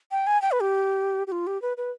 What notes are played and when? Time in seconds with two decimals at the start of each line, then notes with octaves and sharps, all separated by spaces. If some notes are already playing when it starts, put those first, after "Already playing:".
0.11 G5
0.27 G#5
0.42 G5
0.52 B4
0.61 G4
1.27 G4
1.32 F4
1.47 G4
1.62 B4
1.77 B4